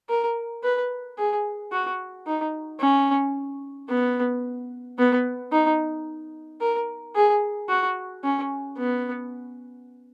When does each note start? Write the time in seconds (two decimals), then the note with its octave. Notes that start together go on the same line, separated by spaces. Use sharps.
0.10 A#4
0.63 B4
1.18 G#4
1.72 F#4
2.27 D#4
2.80 C#4
3.89 B3
4.98 B3
5.52 D#4
6.61 A#4
7.16 G#4
7.69 F#4
8.24 C#4
8.78 B3